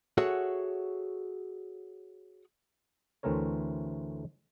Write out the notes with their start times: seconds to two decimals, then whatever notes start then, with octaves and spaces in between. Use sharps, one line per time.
0.18 F#4 G#4 A4 C#5 E5 F#5
3.23 D2 E3 A3 C4 A#4 C#5